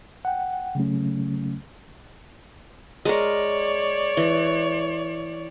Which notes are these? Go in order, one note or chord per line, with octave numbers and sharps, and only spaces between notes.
F#5 G5
C#3 F#3 A3 C#4
G#3 A#4 C#5 D5
E3